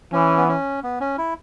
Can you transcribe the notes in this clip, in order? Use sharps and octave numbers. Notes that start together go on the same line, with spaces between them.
E3 C#4
B3
C#4
B3
C#4
E4